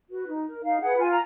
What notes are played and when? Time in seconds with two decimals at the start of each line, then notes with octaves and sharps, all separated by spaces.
0.10 F#4 B4
0.28 D#4
0.46 A#4
0.63 D#4 F5
0.81 G#4 B4 F#5
0.98 F4 G#5
1.11 A#5